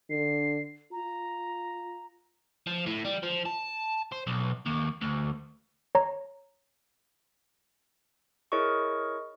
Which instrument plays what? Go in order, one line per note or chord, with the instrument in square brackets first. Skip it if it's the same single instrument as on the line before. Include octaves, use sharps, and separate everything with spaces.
[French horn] D3 [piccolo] C7
[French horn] F4 [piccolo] A#5
[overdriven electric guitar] F3
A2
G3
F3
A5
C5
B1
D#2
D2
[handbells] C#5 A#5
E4 G#4 A#4 C#5 D#5 C#6